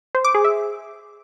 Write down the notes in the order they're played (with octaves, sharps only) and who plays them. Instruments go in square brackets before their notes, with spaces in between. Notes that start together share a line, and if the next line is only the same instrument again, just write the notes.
[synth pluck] C5
D6
G#4
E5